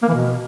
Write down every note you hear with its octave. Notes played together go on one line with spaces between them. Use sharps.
A#3
E3
B2